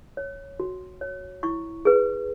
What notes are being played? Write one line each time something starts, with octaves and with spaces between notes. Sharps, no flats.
C#5
F#4
C#5
E4 C#6
G#4 B4